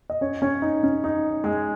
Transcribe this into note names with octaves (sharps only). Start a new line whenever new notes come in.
D#5
C#4 C#5
C#4 C#5
D#4
C#4
D#4
G#3 G#4